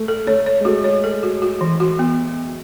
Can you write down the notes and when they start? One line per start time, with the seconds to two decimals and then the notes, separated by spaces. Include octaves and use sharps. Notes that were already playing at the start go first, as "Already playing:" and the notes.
Already playing: A3
0.08 A4
0.27 A3 C#5
0.46 C#5
0.61 G#3
0.65 A3 F#4
0.84 C#5
1.04 A4
1.23 F#4
1.42 F#4
1.61 E3
1.80 F#4
1.99 B3